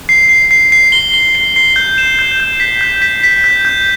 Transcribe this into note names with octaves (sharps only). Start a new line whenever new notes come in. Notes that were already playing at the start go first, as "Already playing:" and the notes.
C7
C7
C7
C7
G7
G7
C7
C7
G6
E7
G6
G6
B6
G6
B6
B6
G6
G6